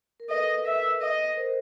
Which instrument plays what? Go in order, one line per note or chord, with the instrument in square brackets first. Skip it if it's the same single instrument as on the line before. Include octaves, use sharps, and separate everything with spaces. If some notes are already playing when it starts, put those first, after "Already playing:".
[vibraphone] A#4
[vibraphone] A4 B4 [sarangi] D#5
[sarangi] E5
D#5
[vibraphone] A#4 C5